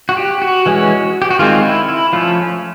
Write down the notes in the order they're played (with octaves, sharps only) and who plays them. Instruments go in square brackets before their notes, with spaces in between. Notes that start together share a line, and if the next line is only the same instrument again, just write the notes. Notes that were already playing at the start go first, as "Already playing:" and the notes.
[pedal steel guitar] F#4
G4
F#4
E3 G#3 C#4
G4
F#4
D#3 G#3 C4 F4
E4
E4
F3 A3 C#4 F4